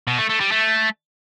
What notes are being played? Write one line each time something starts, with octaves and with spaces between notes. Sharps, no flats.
B2
A3
A3
G3
A3